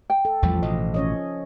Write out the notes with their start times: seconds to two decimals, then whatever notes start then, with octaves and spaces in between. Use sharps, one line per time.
0.10 G5
0.25 A4
0.43 A1 E2 F3 G3
0.62 A1 B2 D#5
0.94 C#4 C#5 D#5